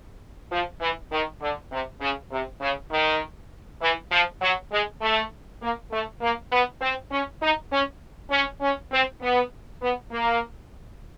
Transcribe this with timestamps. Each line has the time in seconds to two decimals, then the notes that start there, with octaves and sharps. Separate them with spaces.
0.51 F3
0.81 E3
1.11 D#3
1.41 D3
1.71 C3
2.01 C#3
2.31 C3
2.61 C#3
2.91 D#3
3.81 E3
4.12 F3
4.42 F#3
4.71 G#3
5.01 A3
5.61 A#3
5.91 A3
6.21 A#3
6.51 B3
6.81 C4
7.11 C#4
7.41 D#4
7.72 C#4
8.31 C#4
8.61 C#4
8.92 C4
9.22 B3
9.81 B3
10.11 A#3